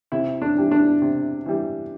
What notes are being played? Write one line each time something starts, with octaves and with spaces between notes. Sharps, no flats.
C3 E4
D4
E3 G3
D4
C3
E3 G3